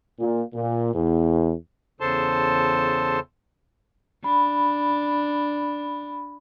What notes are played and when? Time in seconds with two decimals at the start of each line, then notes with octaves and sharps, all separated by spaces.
0.18 A#2
0.54 A#2
0.94 E2
2.00 E2 C#3 A4 C5 A5 C6
4.24 D4 B5